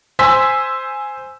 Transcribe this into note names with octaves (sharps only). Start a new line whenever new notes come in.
C5 G#5 C6 E6 B6